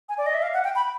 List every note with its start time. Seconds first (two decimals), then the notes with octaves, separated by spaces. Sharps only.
0.09 G#5
0.18 D5
0.26 D#5
0.34 E5
0.42 F5
0.54 F#5
0.64 G5
0.76 B5